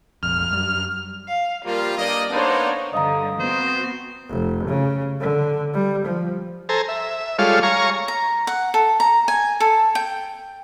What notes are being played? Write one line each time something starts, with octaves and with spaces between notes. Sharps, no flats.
F1 A#1 F2 F6
F#2 G3
F5
F3 G3 A#3 F4
G2 A#3 D5 D#5
A#3 B3 D4 D#4 C5 C#5
G2 D3 D#5 F5 A#5 D#6
B3 C4 F#4 C5
F1
C#3
D3
G3
F3
A4 C5 G#5 A#5
E5
G3 G#3 F4 A4 C#5 F5
C#5 F5 G#5 A#5 C#6
A#5
F#5
A4
A#5
G#5
A4
G5